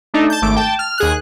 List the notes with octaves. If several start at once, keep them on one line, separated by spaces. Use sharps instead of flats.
A3 D4 D#4
A5 G6
G#1 A3 D6
G5 A5
F6
D#2 G#4 F#6